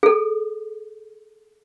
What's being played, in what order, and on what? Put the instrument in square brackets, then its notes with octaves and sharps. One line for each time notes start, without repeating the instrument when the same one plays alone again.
[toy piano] G#4 A4